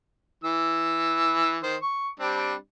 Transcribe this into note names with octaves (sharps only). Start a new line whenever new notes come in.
E3 E6
D#3 C5
C#6
G3 C4 D4